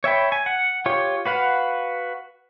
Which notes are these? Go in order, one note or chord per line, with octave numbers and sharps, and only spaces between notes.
C#5 E5 G5 B5
G#5
F#5
F4 G4 C#5
F#4 B4 F5 F#5